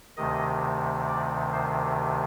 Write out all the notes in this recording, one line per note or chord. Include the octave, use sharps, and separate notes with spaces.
D2 C3 D#3 D#5
D5
C5